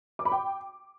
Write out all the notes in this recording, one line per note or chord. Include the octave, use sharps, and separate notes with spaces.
D6
B5
G5